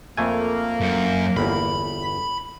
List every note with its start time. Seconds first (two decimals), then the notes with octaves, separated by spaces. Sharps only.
0.17 F2 A3 A#3 G#5
0.81 F#2
1.37 G1 E2 B5